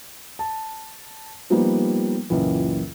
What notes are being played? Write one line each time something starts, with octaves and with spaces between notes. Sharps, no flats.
A5
F3 G3 A#3 B3 D#4
C#2 F#2 A#2 E3